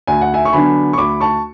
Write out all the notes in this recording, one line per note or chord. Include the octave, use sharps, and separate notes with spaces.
D2 G#5
F#5
E5 G#5
C#6
D3 F#3 B3 D4 G#5 B5
C#6
D2 B5 D6
A5 C#6